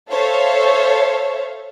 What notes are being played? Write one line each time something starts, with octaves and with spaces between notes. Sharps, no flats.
A4 C5 C#5 E5 F5